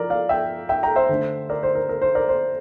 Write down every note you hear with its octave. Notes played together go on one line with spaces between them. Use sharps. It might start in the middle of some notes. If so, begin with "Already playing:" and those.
Already playing: F3 E4 A#4 D5
D5 F5
E5 G5
E5 G5
G5 A#5
C5 E5
D3 A3 D4
A#4 D5
C5
A#4
A#4
C5
A#4 D5
C5